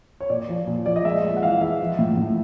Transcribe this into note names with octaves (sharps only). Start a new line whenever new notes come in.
C#5
A#2 D5
F3
A#2
F3 D5
D#5
G#3 E5
G#3
F#5
E3 F5
G#3 E5
F3
A2
A2